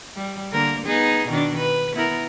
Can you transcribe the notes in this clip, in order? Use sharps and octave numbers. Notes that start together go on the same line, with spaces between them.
G3
D3 A#3 A#4
B3 D#4 G#4
B2 D#3 D4
B4
B3 E4 A#4